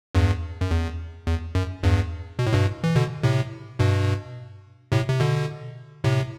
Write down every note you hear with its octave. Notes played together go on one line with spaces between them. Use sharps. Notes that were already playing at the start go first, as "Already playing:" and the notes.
E2 G2
F#2
E2
E2
F#2
E2 G2
B2
A2
G2 B2
E3
B2 D3
A2 C3
G2 B2
A2 C3
C3
B2 D3
A2 C3